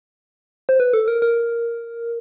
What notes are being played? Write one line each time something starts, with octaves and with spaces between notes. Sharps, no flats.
C5
B4
A4
A#4
A#4